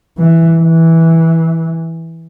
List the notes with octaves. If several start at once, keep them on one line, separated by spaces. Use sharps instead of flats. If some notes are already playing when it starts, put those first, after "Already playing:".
E3
E3